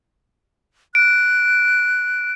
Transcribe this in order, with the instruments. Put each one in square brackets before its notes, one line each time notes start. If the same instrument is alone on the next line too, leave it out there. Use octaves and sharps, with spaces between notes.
[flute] F#6 [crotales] D7